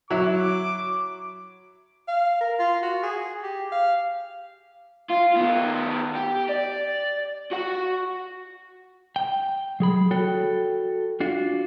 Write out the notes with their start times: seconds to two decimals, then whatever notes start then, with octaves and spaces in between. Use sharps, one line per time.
0.10 F#3 E4 D6
2.08 F5
2.41 A#4
2.59 F4
2.82 F#4
3.03 G#4
3.43 G4
3.72 F5
5.10 F4
5.36 D#3 B3
6.15 G4
6.49 D5
7.52 F#4 F#5
9.16 G5
9.80 F#3 G#4 B5
10.11 F#4 A4 C#5 G5
11.20 D4 F4 F#4